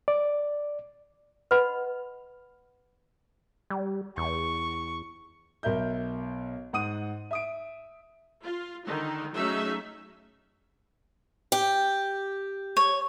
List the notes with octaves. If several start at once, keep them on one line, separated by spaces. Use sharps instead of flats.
D5
B4 D#5 F#5 B5
G3
E2 C#6
B1 A#4 E5 G6
G#2 F#5 D#6 D#7
E5 D#6 D7
F4
D3 D#3 D#4
F#3 A3 C#4 D#4 G#4 E5
G4
C#5